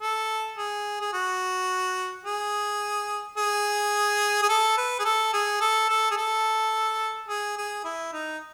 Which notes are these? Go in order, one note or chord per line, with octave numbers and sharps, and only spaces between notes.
A4
G#4
G#4
F#4
G#4
G#4
G#4
A4
B4
G#4
A4
G#4
A4
A4
G#4
A4
G#4
G#4
E4
D#4